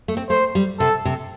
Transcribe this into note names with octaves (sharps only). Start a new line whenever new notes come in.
A3
C4
A3 C5
G3
C3 A4
C3